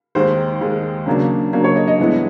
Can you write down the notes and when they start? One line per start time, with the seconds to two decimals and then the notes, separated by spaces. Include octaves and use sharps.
0.15 D#2 D#3 G#3 C5
0.61 D#2 D#3 G#3
1.06 C#3 F#3 A#3 D4
1.53 C#3 F#3 A#3 D4
1.64 C#5
1.76 D#5
1.88 D#5
1.99 G2 E3 G#3 B3 E4